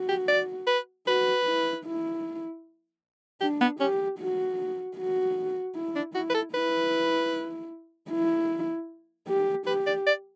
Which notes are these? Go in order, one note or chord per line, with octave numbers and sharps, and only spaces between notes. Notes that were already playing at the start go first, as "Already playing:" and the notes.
Already playing: F#4
G4
D5
B4
F#4 B4
E4
E4
D4 G4
B3
C#4 G4
F#4
F#4
E4
D4
E4 F#4
B4
A4
E4 B4
E4
G4
G4 B4
D5
D5